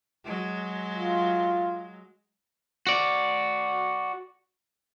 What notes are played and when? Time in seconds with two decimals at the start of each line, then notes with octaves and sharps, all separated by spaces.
0.24 F#3 G#3
0.96 F4
2.87 F#4 D5